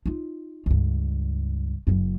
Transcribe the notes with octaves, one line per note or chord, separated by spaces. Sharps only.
D#4 F4
C#2 G2
F#1 F#2